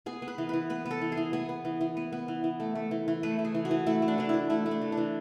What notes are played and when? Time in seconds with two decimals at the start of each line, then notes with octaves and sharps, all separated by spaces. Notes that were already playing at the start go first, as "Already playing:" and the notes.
0.06 B3 G#4
0.22 B3
0.28 B4
0.38 E3
0.49 E3 B4
0.70 B3 B4
0.86 B3
0.91 A4
1.01 E3
1.12 G#4
1.17 E3
1.33 B3 G#4
1.49 B3
1.65 E3
1.81 E3
1.97 B3
2.13 B3
2.28 E3
2.44 E3
2.60 A3
2.75 A3
2.91 E3
3.08 E3
3.23 A3 B4
3.39 A3
3.45 G#4
3.55 E3
3.65 F#4
3.71 E3
3.86 A3 E4
4.02 A3
4.08 D4
4.18 E3 D4
4.29 E3 E4
4.50 A3 E4
4.66 A3
4.71 D4
4.82 E3
4.92 D4
4.97 E3